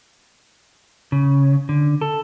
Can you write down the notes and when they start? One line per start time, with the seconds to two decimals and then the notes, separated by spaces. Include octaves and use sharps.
1.12 C#3
1.69 D3
2.01 A4